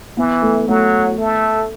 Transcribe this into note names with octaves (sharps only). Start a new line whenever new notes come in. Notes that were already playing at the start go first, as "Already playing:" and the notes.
E3 B3
A3
F#3 A3
A3